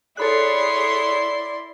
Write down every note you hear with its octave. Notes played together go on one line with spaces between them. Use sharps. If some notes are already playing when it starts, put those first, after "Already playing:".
E4 G#4 A4 C#5 D5 B5 C6 F#6